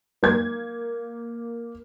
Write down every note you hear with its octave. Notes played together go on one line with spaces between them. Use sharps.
A#3 G#6